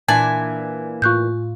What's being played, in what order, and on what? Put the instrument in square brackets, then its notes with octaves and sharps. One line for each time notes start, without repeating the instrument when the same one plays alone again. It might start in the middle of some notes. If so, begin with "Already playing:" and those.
[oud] A#2 E3 D4 [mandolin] G#5 [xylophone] A5 A6 F#7
[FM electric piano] A2 F4 [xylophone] C#6 F#6 G6